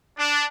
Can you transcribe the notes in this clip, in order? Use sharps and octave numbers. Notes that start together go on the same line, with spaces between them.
D4